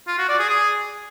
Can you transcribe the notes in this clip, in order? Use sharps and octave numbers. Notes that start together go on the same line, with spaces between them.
F4
F#4
D5
G#4
G#4